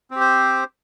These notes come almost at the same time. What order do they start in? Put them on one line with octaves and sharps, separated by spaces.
C4 G4 C5